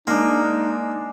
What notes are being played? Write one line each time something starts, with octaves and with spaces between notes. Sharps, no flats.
G#3 A#3 D4 D#4